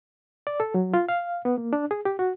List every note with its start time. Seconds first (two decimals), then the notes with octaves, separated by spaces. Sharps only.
0.47 D5
0.60 A4
0.74 F#3
0.94 F4
1.08 F5
1.45 B3
1.58 A#3
1.73 D4
1.91 G#4
2.05 G4
2.19 F#4